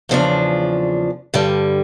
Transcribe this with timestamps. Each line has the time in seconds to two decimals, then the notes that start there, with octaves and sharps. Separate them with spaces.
0.09 E2 C#3 F3 A#3 D4
1.34 G2 D3 G3